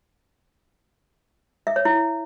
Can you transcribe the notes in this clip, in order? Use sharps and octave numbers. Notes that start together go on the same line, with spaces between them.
E5
C#5
E4